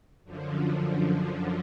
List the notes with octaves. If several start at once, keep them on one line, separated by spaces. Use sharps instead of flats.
F#2 D3 F3